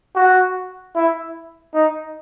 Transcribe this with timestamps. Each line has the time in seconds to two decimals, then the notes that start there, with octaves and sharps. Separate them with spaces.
0.16 F#4
0.96 E4
1.74 D#4